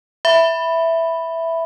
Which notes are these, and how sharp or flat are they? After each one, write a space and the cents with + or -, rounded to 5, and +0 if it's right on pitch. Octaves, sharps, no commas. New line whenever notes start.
E5 +0 B5 +0